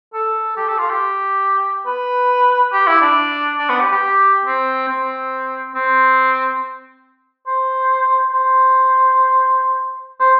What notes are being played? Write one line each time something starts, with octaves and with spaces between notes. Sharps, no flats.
A4
G4
A4
F4
G4
B4
G4
E4
D4
D4
B3
G4
G4
C4
C4
C4
C5
C5
C5